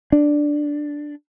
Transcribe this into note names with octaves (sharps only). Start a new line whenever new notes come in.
D4